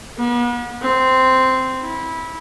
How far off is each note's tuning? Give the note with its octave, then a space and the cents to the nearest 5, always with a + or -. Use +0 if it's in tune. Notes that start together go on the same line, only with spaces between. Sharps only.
B3 -40
C4 -10
E4 -20